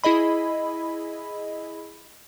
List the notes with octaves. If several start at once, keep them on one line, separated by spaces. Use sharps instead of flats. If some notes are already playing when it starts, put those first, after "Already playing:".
E4 G#4 D#5 B5